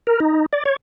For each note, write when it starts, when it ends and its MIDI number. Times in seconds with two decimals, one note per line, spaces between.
0.07 0.20 70
0.20 0.46 63
0.53 0.63 74
0.65 0.76 73